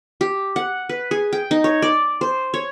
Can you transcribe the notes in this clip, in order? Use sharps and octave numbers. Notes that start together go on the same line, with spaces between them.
G4
F#5
B4
G#4
G5
D#4
C#5
D5
C5
C#5